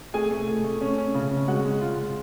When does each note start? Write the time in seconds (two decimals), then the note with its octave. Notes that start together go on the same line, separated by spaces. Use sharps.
0.14 A3 G#4 G#5
0.31 A3
0.48 A3
0.64 A3
0.81 C#4
0.98 C#4
1.14 C#3
1.31 C#4
1.48 G#3 F#4 F#5
1.65 G#3
1.81 F4
1.98 F4